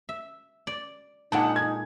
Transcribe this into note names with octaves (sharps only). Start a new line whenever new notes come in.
E5
D5
A#2 G#3 D4 D#4 F#5 A5
G#6